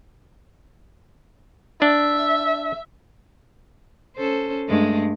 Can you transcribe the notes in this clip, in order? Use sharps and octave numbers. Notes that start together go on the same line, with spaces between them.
D4 E5
C#4 A4 C5
G2 G#3 A3